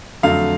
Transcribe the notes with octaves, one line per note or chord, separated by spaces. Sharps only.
F2 D3 F#3 A3 F5